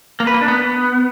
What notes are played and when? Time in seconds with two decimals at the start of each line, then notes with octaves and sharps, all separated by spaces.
0.20 A#3
0.27 B4
0.34 A#3
0.41 D4
0.48 B3